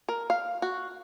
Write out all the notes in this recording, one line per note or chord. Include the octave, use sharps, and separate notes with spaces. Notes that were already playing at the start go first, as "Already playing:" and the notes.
A#4
F5
F#4